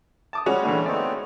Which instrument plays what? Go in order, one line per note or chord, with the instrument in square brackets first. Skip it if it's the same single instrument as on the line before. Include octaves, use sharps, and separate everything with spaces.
[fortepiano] A5 D6 D#6
[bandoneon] G3 [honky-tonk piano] G#3 C#4 F#4
[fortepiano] A#2 D3 E3 [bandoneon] G3 A3
[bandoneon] A3 B3 C4 [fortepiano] D#4 D5